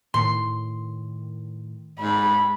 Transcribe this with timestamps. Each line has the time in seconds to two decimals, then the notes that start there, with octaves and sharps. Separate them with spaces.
0.14 A2 D#3 C6
2.00 G#2 B5